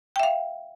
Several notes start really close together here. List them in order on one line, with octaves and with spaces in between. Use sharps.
G5 E5 F5